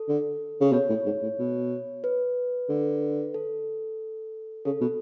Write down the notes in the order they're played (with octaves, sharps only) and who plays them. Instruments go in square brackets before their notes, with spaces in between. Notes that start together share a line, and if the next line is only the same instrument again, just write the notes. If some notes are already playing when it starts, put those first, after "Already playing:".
Already playing: [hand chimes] A4
[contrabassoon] D3
C#3
[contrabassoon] B2 [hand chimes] C#5
[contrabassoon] A2
G#2
A2
B2
[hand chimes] B4
[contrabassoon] D3
[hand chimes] A4
[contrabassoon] C#3 [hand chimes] A4
[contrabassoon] B2